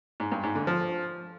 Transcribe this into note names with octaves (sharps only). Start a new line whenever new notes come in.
G#2
G2
G#2
D3
F3